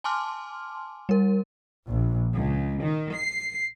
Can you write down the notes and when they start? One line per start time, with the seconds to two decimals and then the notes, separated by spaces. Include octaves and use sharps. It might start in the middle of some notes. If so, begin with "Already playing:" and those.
0.04 G#5 A5 C6 D6 F6
1.09 G3 A#4
1.87 A#1
2.35 C#2
2.82 D#3
3.14 C7